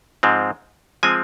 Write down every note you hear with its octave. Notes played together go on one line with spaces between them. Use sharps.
G#2 F3 G#3 C4
F3 G#3 C4 G#5